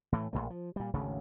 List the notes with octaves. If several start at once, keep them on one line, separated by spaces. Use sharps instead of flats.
A2 E3 A3
A#1 F#2 A#2 A3
F3
A#2 G3
G#1 D2 C#3 A3